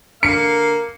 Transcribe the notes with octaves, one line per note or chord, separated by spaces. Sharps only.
D3 A#3 A#4 F5 C7 C#7